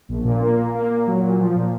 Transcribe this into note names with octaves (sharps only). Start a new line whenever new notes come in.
A#1
A#2
A#3
A#2
A#3
A#2
F#3
A#2
F3
A#2